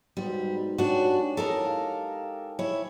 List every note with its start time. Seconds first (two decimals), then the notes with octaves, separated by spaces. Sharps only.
0.17 G#2 B2 G3
0.78 C#4 D4 F#4 G4
1.37 C#4 E4 A4 A#4 D#5 A#5
1.65 G4 F5 A5
2.59 E4 C#5